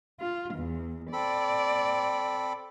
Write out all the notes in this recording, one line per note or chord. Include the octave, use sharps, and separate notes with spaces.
F4
E2
C4 A4 D5 B5